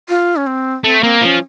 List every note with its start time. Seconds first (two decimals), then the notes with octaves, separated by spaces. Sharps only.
0.09 F4
0.36 C#4
0.47 C4
0.84 A3 C4
1.03 A#3 C4
1.22 F3 C#4